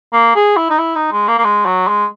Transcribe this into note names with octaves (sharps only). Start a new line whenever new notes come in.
A#3
G#4
E4
D#4
E4
D#4
G#3
A#3
A#3
G#3
F#3
G#3